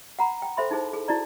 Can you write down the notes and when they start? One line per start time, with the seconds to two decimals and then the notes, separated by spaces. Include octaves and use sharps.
0.19 F#5 A#5 B5
0.42 G5
0.57 A4 C5 E5 B5 C6
0.71 D#4 E4 G#4 C5
0.93 G#4 A4
1.08 E4 F#4 D5 A#5